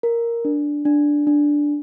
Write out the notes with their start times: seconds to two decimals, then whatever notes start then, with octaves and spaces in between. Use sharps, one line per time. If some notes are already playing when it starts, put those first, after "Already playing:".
0.03 A#4
0.45 D4
0.85 D4
1.27 D4